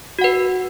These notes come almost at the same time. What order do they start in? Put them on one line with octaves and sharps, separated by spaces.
F#4 F#5 B4